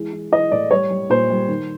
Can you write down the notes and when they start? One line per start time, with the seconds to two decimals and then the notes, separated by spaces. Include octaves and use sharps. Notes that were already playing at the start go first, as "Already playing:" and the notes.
Already playing: E3 G#3
0.13 E3
0.32 E3 D#5
0.52 A2 D5
0.71 G3 C#5
0.91 G3
1.10 A#2 C5
1.30 G3
1.49 D#3